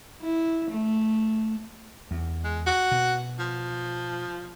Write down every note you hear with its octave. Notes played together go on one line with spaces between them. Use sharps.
E4
A3
E2
G#3
F#4
B2
F3